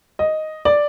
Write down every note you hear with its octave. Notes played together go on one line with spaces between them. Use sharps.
D#5
D5